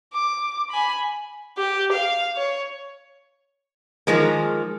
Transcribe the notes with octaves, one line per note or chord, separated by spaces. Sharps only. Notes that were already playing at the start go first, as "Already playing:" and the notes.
D6
G#5 B5
G4
F5
C#5
D#3 F3 G#3 A#3